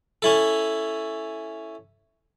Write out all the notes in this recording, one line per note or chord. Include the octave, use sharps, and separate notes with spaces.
C#4 E4 A4